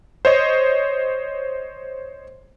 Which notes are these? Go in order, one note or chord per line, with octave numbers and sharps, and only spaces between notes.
C5 C#5 D#5